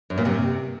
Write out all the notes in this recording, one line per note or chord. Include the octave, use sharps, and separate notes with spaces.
F#2
A#2
C3